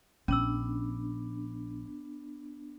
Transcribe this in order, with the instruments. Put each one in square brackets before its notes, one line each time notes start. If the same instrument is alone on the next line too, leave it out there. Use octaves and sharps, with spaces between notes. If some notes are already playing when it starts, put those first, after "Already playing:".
[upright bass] A#1 [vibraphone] B3 D4 [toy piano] C#4 E6